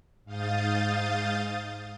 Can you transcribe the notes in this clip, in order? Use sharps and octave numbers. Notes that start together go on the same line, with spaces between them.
G#2 F5 D#6 G6 A6